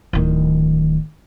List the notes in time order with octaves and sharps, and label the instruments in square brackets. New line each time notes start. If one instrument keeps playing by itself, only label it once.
[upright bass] D1 D#3